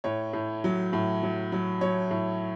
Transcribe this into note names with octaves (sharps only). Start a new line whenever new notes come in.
A2 C#5
A2
F#3
A2
F#3
F#3
F#3 C#5
A2